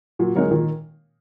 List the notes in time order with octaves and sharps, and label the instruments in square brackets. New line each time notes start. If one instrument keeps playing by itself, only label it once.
[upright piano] A#2 [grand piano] F#3
[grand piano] F#3 [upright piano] G#3 D#4 A#4 C#5
[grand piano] F#3
[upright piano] A#2 [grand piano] D#3